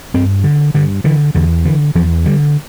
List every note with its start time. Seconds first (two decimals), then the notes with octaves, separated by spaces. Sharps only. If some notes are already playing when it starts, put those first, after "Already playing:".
0.14 G2 C4
0.44 D3
0.75 G2 D3
1.04 D3 E3
1.35 E2 D3
1.65 D3 E3
1.95 E2 F3
2.25 D3 G3